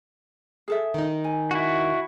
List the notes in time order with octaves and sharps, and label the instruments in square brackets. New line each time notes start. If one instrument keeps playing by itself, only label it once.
[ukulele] G#4 A4 E5
[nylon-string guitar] D#3 D#4
[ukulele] G#5
[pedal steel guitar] E4 F#4